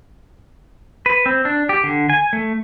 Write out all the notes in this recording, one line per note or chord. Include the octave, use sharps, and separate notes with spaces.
B4
C4
D4
G4
D3
G#5
A3